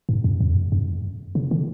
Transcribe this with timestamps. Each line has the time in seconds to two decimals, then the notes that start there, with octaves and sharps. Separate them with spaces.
0.09 G#2
0.24 F#2
0.41 F2
0.72 F#2
1.35 C#3
1.51 D3